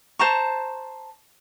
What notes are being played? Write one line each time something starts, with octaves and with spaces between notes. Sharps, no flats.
C5 A5 A#5 C#6